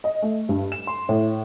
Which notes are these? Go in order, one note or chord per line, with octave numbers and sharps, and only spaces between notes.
D#5
A3
G2
E7
C6
A2